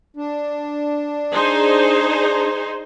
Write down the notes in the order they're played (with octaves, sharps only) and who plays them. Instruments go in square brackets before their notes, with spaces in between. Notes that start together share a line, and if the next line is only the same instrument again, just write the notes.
[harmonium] D4
[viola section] D#4 G#4 C5